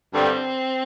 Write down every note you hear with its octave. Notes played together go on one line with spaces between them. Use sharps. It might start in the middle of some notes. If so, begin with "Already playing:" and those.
G2 D3 G3 C4